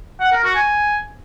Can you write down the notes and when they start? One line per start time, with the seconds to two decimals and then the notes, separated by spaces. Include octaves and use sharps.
0.20 F#5
0.32 A#4
0.44 F#4
0.55 G#5